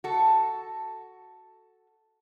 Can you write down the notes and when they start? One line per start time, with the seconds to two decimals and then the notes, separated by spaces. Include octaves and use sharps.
0.04 F#4 A4